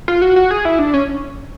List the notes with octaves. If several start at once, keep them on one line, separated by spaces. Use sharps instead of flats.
F4
F#4
F#4
G#4
E4
D4
C#4